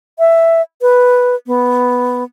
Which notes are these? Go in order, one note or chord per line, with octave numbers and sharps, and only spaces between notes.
E5
B4
B3